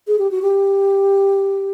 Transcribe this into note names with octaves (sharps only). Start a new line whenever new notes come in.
G#4
G4
F#4
G4